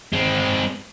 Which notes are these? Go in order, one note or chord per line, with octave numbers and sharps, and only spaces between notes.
G#3 C4